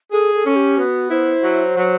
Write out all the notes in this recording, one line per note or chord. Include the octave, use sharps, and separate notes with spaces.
G#4 A4
A4
C#4
G4
B3 F#4
E4 C5
F#3
F#3